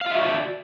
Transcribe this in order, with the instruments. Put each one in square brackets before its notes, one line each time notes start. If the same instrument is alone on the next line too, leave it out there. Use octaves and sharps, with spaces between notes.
[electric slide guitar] F5
F4
E5
F#4
D5